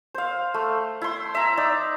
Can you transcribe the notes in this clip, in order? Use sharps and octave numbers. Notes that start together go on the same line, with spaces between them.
C5 F5
A3
E4 C6
E5 A#5
D#4 D5